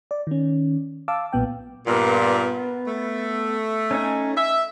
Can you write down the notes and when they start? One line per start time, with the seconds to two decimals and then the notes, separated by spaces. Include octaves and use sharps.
0.11 D5
0.27 D#3 C#4
1.08 F5 A5 D6 E6
1.33 B1 A#2 B3 G5
1.87 G2 A#2 B3
2.87 A3
3.91 C#4 D#4 G#5
4.37 E5 E6